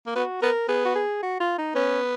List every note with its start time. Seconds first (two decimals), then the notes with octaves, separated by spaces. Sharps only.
0.06 A#3
0.16 B3 F#4
0.42 B3 A#4
0.69 B3 G#4
0.85 F#4
0.95 G#4
1.23 F#4
1.40 F4
1.58 D#4
1.75 B3 C#4